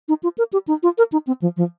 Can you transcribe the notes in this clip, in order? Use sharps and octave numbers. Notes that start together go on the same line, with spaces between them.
D#4
F4
A#4
G4
D#4
F4
A#4
D#4
C4
F3
F3